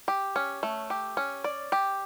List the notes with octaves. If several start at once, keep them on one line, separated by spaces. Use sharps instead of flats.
G4
C#4
A3
G4
C#4
D5
G4